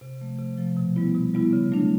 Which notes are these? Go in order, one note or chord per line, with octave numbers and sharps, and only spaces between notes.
C3
F3 A3
C3
F3 A3
B2
G3 B3 E4
B2
G3 B3 E4
C#3
F#3 A3 D4